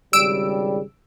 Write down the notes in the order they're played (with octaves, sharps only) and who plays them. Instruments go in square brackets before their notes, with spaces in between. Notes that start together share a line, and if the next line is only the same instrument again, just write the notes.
[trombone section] G#1 C#3 G3 [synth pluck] E6 D7